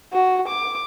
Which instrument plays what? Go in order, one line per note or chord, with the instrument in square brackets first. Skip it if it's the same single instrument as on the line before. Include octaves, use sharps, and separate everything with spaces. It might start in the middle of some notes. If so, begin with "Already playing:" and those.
[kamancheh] F#4
D6